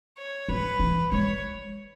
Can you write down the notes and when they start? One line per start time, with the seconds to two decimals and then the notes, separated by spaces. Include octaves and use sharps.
0.18 C#5
0.49 F#3 B4
0.79 E3
1.12 G#3 C#5